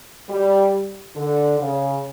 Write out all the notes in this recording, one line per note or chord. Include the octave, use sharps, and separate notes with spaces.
G3
D3
C#3